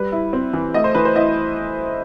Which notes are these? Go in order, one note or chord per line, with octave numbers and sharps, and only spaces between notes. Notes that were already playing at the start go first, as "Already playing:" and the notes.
Already playing: G3 B4
E4
C4
E3
A3 D#5
C5
E3 B4
C5
E4 D#5